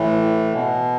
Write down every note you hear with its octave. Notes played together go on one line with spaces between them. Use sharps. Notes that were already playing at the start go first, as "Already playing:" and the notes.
Already playing: A2 E3
B2